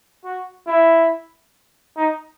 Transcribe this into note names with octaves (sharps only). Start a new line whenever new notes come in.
F#4
E4
D#4